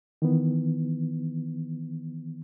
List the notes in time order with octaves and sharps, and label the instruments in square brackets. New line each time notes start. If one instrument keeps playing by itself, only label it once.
[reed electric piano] D#3 E3 B3